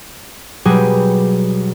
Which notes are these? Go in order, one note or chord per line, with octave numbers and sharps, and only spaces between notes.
B2 F#3 G3 G4 G#4